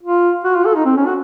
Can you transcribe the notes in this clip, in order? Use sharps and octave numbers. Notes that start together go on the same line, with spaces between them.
F4
F#4
F4
A4
D#4
C4
C#4
F#4